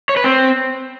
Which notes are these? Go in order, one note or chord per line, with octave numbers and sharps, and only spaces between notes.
C#5
B4
C4